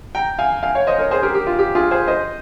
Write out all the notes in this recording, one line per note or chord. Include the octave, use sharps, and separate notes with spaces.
G5 A#5
F5 G#5
F5 G#5
C#5 F5
C5 D#5
A#4 C#5
G#4 C5
G4 A#4
G4
F4
G4
F4 G#4
G#4 C5
C5 D#5